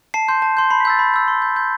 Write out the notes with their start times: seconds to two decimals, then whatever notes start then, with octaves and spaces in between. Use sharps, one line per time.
0.14 A5 C7
0.28 C6 G6
0.42 A5
0.57 C6 G6
0.70 B5 C7
0.80 B6
0.85 E6 G6 A6
0.99 B5
1.14 E6 G6
1.28 C6
1.42 G6
1.56 C6 G6